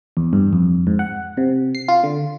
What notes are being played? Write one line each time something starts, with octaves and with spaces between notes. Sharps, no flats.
E2
G2
F2
G#2
F#5
C3
C7
F4
D3